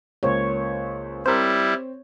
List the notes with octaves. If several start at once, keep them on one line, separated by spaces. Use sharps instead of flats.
C#2 A#3 C5 C#5
G3 C4 E4 A#4 C5